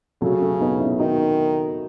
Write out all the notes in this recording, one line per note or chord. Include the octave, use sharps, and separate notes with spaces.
C#3 F#3 A3
A3 C#4
B3 D#4
C#4 E4
D#3 D#4 F#4